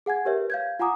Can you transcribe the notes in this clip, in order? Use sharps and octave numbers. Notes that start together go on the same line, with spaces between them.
G#4 F#5 G#5 G#6
G4 A#4 B4 C#5 E5
F5 G6 G#6
F4 F#5 G#5 A#5 D6 D#6